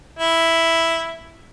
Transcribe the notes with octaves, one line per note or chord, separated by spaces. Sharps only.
E4